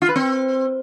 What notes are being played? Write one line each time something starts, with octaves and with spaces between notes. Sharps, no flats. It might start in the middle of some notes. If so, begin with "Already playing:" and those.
F4
B4
C4